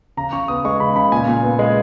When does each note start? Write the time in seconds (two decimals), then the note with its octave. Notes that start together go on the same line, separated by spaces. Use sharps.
0.17 C#3 A#5
0.33 C#3 C#6
0.48 B3 D#6
0.65 G#3 C#6
0.80 C#3 B5
0.96 C#3 B5
1.12 A#2 G#5
1.28 A#2
1.43 B3
1.59 G#3